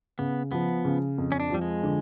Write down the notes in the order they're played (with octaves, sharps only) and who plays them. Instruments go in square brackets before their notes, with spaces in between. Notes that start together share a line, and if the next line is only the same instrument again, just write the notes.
[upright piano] C#3 [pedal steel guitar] B3
[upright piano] F3 [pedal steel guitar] B3
[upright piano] C#3
F2
[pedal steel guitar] C#4
D4
[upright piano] F3 [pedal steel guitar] G3
[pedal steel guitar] G#3
[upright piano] D3